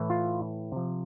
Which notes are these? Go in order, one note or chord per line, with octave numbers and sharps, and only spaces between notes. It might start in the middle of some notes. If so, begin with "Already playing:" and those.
Already playing: A2 E3
F4
C3 F3